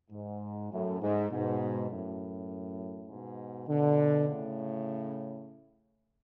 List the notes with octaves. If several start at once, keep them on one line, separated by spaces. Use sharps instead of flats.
G#2
F#2 A2
G#2
G#2 B2
F#2 A2
G#2 B2
B2 D3
A2 C#3